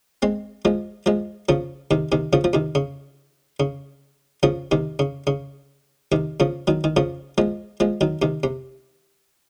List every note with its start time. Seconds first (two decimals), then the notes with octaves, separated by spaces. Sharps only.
0.22 G#3 C4
0.65 F3 G#3
1.06 F3 G#3
1.49 C#3 F3
1.91 C3 D#3
2.12 C3 D#3
2.33 C#3 F3
2.44 F3
2.53 C3 D#3
2.75 C#3
3.60 C#3
4.43 C#3 F3
4.71 C3 D#3
4.99 C#3
5.27 C#3
6.12 C3 D#3
6.40 C#3 F3
6.67 D#3 F#3
6.84 D#3
6.97 C#3 F3
7.38 F3 G#3
7.80 F3 G#3
8.01 D#3 F#3
8.22 C3 D#3
8.43 C3